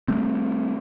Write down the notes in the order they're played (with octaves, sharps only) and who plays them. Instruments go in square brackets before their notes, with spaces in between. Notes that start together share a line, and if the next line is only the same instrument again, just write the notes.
[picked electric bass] G3 A3 C4